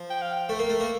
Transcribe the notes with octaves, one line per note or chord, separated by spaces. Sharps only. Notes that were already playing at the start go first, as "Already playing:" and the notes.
Already playing: F3
G5
F5
G5
A3
A#3
A3
A#3